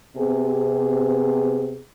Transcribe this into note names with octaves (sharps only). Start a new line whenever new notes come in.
C3 B3 G#4